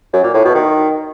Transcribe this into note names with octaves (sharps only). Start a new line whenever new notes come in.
F#2
A#2
A2
B2
D#3